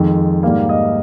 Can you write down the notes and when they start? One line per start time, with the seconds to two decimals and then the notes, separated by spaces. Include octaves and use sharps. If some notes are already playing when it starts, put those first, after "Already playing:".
Already playing: F2 D#3 G#3
0.43 G#2 G3 A#3 F5
0.69 D#5